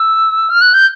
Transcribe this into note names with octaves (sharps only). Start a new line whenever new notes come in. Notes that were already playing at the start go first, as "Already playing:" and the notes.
Already playing: E6
F6
F#6
G6